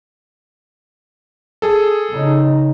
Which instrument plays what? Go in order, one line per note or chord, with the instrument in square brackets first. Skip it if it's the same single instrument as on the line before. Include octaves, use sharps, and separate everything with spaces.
[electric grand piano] G#4 A4
[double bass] C#3 D#4